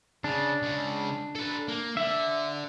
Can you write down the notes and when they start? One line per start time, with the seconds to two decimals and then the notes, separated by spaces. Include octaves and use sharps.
0.24 C#3 D4
0.63 C#3 G#3
1.35 A4 B4
1.68 A#3
1.97 D3 E5